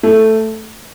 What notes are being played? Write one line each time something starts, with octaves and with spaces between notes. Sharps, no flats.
A3